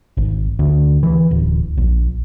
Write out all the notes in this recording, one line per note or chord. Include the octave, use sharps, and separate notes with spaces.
G#1
D2
E3
D1
A#1